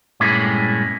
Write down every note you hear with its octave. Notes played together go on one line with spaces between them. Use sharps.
G2 A#2 G#3 A3 C#4 E4